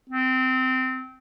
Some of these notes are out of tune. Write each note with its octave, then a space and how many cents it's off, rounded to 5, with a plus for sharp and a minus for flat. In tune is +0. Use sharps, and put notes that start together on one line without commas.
C4 -20